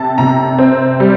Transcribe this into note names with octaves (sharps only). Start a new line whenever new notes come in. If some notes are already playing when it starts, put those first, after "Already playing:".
Already playing: C3 A5
C3 A#5
C4
G3